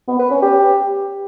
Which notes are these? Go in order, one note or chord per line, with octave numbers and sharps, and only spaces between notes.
B3
B4
C#4
G4